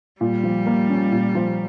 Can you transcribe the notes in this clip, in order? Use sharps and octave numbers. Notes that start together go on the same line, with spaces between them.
A#2 G3
F3
A#3
C#4
A#2
F3